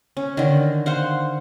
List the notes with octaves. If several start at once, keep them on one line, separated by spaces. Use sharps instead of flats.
C#4
D3 D#3
C5 F5 F#5